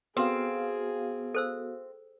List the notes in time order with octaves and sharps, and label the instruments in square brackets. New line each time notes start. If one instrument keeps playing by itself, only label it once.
[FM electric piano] B3 F#4 F5 [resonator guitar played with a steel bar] C4 [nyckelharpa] G#4 [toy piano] A4
[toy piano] A4 C5 E6